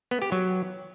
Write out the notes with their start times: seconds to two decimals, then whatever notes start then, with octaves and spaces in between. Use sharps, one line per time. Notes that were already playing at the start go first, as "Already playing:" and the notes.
0.11 B3
0.22 G4
0.32 F#3